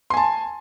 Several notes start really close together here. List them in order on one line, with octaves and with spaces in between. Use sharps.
C6 G#5 A5